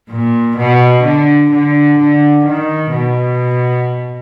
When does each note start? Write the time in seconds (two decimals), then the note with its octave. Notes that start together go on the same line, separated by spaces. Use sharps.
0.10 A#2
0.58 B2
1.04 D3
1.51 D3
1.99 D3
2.45 D#3
2.92 B2